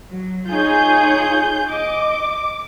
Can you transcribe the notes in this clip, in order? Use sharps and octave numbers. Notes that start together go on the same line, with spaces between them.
F#3
D#4 F4 G#4 C#5 G6
D#5 D6